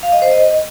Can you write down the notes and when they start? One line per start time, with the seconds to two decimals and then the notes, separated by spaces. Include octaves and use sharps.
0.03 F5
0.12 D#5
0.22 C5
0.31 D#5